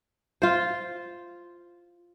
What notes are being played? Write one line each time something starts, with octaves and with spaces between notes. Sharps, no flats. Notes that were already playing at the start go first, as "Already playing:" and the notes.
F4 C5